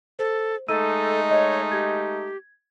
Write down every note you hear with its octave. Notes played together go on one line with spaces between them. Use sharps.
A4 C5
G#3 A3 D#4 A4 E6 D#7
C#5 D#5
G4 G#6